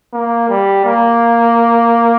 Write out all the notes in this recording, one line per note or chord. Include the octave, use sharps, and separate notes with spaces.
A#3
G3
A#3